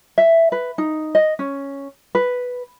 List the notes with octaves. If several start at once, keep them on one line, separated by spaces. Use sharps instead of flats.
E5
B4
D#4
D#5
C#4
B4